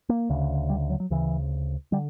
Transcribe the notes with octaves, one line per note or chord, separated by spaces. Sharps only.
A#3
D2 C#3
G3
F#3
F#3
D2 C#3 E3
D3 G3